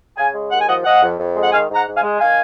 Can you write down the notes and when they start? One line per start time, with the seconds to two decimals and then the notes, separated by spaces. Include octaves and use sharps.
0.17 C#3 F5 G#5
0.34 G#3
0.51 D#2 F#5
0.60 G#5
0.67 F3 D#5 F#5
0.84 F3 D#5 F#5
1.02 F2
1.19 F2
1.36 G#3
1.43 F#5
1.52 D#3 F5 G#5
1.69 G#2
1.75 F#5 A#5
1.86 G#2
1.97 F5 G#5
2.03 G#3
2.20 D#3 F5 G#5